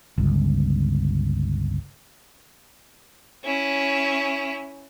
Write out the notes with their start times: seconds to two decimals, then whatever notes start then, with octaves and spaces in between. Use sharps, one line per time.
0.18 G1 C#2
3.44 C#4 E4